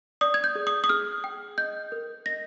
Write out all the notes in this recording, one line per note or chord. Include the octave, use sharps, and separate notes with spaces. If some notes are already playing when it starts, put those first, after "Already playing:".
D5 D#6
G#6
G6
G#4
D#6
D#6
G#4 F6
G5
D#5 G6
A#4
D#5 A#6